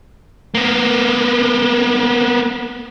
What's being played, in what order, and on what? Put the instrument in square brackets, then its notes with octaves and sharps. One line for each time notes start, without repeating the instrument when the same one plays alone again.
[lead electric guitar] A#3 B3